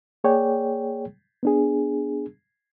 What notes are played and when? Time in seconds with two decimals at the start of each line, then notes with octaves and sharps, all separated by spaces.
0.24 A#3 G#4 C#5 D5 G5
1.43 B3 D4 G#4